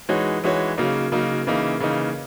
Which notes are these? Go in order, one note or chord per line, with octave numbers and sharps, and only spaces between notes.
E3 G#3 D#4 F#4 C#5
E3 G#3 D#4 F#4 C#5
C#3 F#3 A#3 D#4
C#3 F#3 A#3 D#4
C#3 E3 A#3 D#4
C#3 E3 A#3 D#4